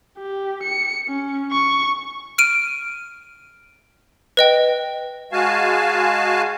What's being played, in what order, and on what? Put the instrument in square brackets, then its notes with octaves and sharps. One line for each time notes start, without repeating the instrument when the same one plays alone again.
[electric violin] G4
C#7
C#4
C#6
[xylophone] F6 D7 D#7
B4 D#5 G5
[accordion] G#3 F#4 F5 G#5 A5